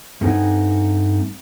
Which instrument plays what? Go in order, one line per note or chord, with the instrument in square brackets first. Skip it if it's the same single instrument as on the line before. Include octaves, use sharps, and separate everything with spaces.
[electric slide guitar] G2 A3 C4 D#4 F#5 G#5